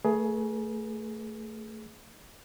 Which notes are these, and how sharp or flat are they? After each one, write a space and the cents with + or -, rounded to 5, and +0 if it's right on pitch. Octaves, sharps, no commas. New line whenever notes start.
A3 +15 G#4 +20 B4 -40